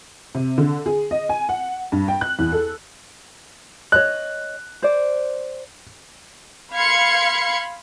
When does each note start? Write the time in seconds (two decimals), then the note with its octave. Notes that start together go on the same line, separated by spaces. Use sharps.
0.35 C3
0.58 D3
0.86 G#4
1.11 D#5
1.29 G#5
1.49 F#5
1.92 G2
2.08 G5
2.21 F#6
2.39 E2
2.52 A4
3.92 C#5 D#5 F#6
4.82 C5 D5
6.74 F5 B5 C6 G#6 C#7